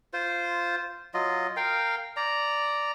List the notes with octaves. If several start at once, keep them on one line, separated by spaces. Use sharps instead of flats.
F4 C5
F#3 F4 D#5
A#4 F5 G5
D5 A#5